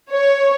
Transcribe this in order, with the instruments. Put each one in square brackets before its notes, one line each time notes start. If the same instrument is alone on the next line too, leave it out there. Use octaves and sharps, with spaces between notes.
[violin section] C#5